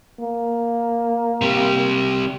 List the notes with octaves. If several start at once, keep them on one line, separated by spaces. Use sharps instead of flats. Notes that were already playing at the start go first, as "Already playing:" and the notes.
A#3
C3 G3